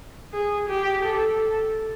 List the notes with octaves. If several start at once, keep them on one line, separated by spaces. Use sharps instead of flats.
G#4
G4
A4